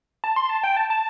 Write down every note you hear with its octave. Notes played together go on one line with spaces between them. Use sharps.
A5
C6
A5
G5
A5
A5